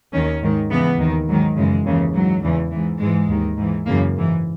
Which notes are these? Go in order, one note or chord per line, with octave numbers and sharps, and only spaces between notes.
D#2 D#3 C#4
G#2 D#3
E2 C#3 E3 B3
D#2 D#3
G#2 D#3 F#3
F#2 C#3 E3 G#3
D#2 C#3 E3
G#2 E3 F#3
E2 C#3 E3
G#2 E3
G#2 E3 G#3
D#2 D#3
G#2 E3
F#2 C#3 E3 A#3
G#2 E3